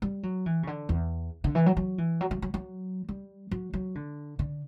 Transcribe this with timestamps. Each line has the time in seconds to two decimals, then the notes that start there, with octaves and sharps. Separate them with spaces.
0.02 G3
0.23 F#3
0.46 E3
0.63 C#3
0.67 D3
0.89 E2
1.44 D3
1.55 E3
1.66 F#3
1.77 F#3
1.98 E3
2.21 F#3
2.31 F#3
2.42 F#3
2.54 F#3
3.09 G3
3.51 F#3
3.73 F#3
3.95 D3
4.39 D3